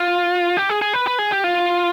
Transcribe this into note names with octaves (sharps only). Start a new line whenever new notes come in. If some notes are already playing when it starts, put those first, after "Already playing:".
Already playing: F4
G4
G#4
G#4
B4
B4
G#4
G4
F4